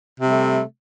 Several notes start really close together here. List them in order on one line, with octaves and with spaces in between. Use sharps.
C3 G3 A3